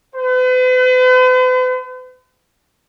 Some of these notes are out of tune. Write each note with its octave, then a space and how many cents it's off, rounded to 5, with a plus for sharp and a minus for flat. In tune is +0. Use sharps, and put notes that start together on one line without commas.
B4 +45